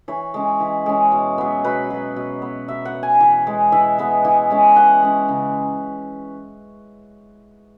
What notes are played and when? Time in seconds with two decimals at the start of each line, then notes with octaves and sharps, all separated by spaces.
0.08 E3 C#5
0.34 G#3 C#4
0.60 E3
0.86 G#3 C#4
1.12 B2
1.38 F#3 B3
1.64 B2 B4
1.90 F#3 B3
2.16 B2
2.42 B3
2.68 B2 E5
2.85 F#5
2.95 B3
3.03 G#5
3.20 E3
3.47 G#3 B3
3.72 E3 E5
3.98 G#3 B3
4.25 E3
4.51 G#3 C#4
4.76 E3 F#5
5.02 G#3 C#4
5.28 C#3